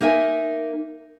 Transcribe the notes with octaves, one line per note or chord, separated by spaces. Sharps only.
A#3 D#4 A#4 E5 G#5